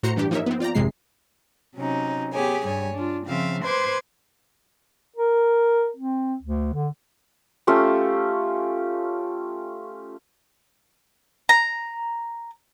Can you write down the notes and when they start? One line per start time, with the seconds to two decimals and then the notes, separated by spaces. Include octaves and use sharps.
0.03 A2 F#4 C5 A#5 C6 C#7
0.16 G2 E3 D4 G4
0.31 F3 A#3 D#4 A#4 C#5 E5
0.46 B3 C4
0.60 F4 D5 G5 A#5
0.75 G#1 F2 C3 G#3 C7
1.76 C3 F#3 C#4 D#4
2.33 B3 G4 G#4 C#5 G#5
2.66 G2 G3 C#5 G#5
2.95 D4 F4
3.26 C#3 F3 C4 E5 F5
3.64 B4 C5 C6 D6 G#6
5.16 A#4
5.97 C4
6.43 D2
6.74 D3
7.67 A3 C#4 F4 G4
11.49 A#5